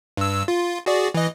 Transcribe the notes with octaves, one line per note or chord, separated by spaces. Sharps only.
G2 E6
F4
F#4 G#4 D5
E3 D#5